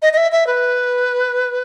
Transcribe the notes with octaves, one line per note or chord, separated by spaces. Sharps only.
D#5
D#5
E5
E5
B4